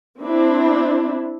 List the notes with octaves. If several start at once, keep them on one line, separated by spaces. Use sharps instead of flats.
C4 D4 E4